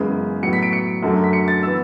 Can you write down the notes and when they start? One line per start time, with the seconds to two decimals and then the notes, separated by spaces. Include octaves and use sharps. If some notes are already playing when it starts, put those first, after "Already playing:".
Already playing: F#2 C#3 E3 G#3 B3
0.43 A2 F#3 B3 C#7
0.53 B6
0.63 D7
0.73 C#7
1.03 F#2 D3 F#3 A3
1.24 B6
1.33 C#7
1.48 A6
1.63 E3 B3 E6